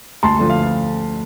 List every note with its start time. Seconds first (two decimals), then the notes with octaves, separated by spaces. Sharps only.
0.23 D2 A5 C6
0.39 D3 F3
0.50 F5